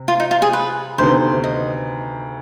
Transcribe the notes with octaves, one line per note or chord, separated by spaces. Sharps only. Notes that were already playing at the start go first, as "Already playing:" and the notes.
Already playing: C3 C4
F4
D#4
F4
G#4
B4
D2 C3 D#3 B3 C5
D#5